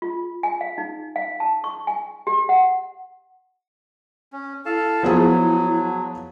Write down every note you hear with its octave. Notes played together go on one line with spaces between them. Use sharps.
F4
G#5
F5
D#4
F5
A5
C#6
G#5
G4
F#5
C#4
E4 A4 F5 A5
F3 F#3 B3 G#4